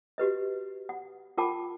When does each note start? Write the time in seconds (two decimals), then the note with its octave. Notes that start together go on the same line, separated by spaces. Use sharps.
0.18 F#4 G4 B4 D#5
0.89 F#5
1.38 F4 A#4 F#5 G5 A5 D6